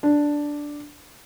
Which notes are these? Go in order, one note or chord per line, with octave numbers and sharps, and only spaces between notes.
D4